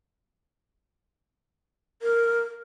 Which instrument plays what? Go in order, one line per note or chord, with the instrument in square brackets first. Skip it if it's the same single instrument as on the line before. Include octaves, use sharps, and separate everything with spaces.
[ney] A#4